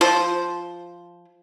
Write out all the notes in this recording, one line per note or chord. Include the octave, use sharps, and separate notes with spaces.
F3 C5